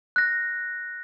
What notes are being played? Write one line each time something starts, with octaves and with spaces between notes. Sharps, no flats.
F#6 A#6